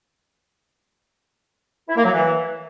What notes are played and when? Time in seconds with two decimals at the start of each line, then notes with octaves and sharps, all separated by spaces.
1.89 E4
1.96 A#3
2.04 F#3
2.12 E3